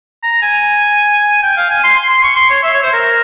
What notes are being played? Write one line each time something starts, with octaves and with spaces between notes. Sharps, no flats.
A#5
G#5
G5
F5
G#5
C6
C6
C6
C#6
C6
C#5
E5
C#5
C5
A#4